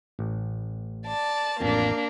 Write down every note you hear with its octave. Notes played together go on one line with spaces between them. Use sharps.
A1
D5 A5
A1 F2 A#3 D4